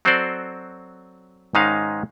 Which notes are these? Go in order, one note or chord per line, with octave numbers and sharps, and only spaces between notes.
F#3 C4 F#4 A4 C5 D5
G#2 D#3 G#3 C#4 D#4 F5